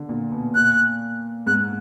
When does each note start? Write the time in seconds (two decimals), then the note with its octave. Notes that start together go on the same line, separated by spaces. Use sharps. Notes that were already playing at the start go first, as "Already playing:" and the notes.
Already playing: D3
0.09 A#2
0.32 B2
0.55 A#2 F#6
1.47 G#2 F#6